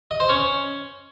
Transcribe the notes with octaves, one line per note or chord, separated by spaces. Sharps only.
D#5
C5
C#4